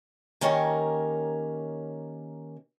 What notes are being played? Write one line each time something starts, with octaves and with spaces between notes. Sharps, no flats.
D#3 A#3 C#4 G4 A#4 C#5